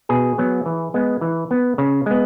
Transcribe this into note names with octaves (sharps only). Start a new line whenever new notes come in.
B2 G#4
F#3 B3
E3
G#3 B3
E3
B3
C#3
G#3 B3